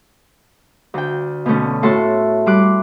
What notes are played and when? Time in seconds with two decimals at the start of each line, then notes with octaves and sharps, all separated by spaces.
0.94 D2 G5
1.46 B2 D3 A3 C#4
1.83 A2 E4 F#4 A4 A5 C6
2.46 G3 C6 D6 F#6